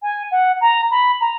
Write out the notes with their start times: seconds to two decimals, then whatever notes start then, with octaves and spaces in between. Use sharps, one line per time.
0.03 G#5
0.31 F#5
0.61 A#5
0.91 B5
1.21 A#5